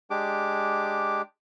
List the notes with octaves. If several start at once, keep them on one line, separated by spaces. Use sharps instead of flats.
G#3 D4 G4 D6